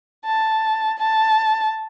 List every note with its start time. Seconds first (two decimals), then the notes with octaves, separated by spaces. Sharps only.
0.25 A5
0.99 A5